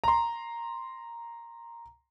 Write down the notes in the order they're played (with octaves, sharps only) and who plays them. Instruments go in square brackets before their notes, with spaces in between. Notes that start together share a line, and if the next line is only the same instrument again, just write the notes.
[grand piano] A#5 C6